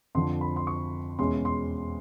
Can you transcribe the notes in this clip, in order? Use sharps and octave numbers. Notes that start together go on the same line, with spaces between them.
F2 D3 F3 C6
B5
C6
C#6
E2 B2 G#3 C#4 C6
C6